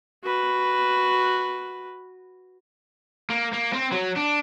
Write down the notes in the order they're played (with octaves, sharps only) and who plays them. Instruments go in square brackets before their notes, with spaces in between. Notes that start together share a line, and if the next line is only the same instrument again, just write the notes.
[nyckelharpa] F#4 B4
[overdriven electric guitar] A#3
A#3
C4
F#3
D4